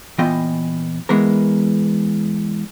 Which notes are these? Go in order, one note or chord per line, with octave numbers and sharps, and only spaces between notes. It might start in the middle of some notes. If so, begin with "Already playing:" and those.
A#2 E3 B3 F4 D#5 G5
E3 G#3 B3 A#4